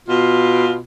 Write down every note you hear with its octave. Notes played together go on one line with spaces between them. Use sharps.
B2 F4